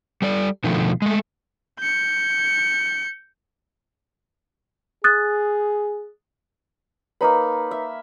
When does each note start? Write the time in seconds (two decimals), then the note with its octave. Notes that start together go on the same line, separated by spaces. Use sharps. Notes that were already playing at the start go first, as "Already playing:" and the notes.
0.22 G3 A4 D5
0.64 B2 D3 D#3 F3 A3
1.02 G#3 A3
1.79 G6 C#7
5.04 G#4 D#6 F#6 A6
7.21 A#3 D#4 B4 C#5 A#5 B5
7.71 E5